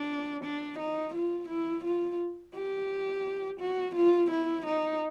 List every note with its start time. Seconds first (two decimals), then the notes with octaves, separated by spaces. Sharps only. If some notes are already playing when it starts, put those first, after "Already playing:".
Already playing: D4
0.44 D4
0.79 D#4
1.14 F4
1.49 E4
1.84 F4
2.55 G4
3.60 F#4
3.95 F4
4.31 E4
4.66 D#4